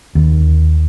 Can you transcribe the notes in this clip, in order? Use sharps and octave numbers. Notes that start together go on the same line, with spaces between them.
D#2